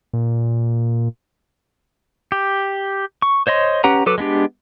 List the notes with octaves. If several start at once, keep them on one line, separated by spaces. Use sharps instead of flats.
A#2
G4
C#6
C5 C#5 D#5 C6
C#4 G4 B4 F#5 A#5
F#3 A4 B4 D6
G#3 B3 D4 G4